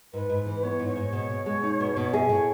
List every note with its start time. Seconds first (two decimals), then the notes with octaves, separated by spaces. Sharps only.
0.13 G#2 B4
0.30 G#2
0.46 E3
0.63 B3 C#5
0.80 G#2
0.88 C#5
0.96 G#2
1.12 B2 C#5
1.30 B2
1.46 G#3
1.63 D#4
1.80 B2
1.97 B2
2.13 G#4 E5
2.29 A2 C#5